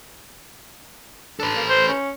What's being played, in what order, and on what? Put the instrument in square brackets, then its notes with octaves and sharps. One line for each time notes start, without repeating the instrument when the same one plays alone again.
[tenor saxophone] D4 [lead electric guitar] A4 B4
[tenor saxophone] A#3
C5
C#4